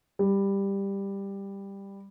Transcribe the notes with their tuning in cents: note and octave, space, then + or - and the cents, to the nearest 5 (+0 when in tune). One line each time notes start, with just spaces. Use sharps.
G3 +10